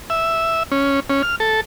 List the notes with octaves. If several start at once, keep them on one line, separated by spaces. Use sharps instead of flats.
E5
C#4
C#4
F6
A4